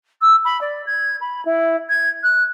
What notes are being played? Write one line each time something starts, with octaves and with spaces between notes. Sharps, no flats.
E6
B5
D5
G#6
B5
E4
G#6
F#6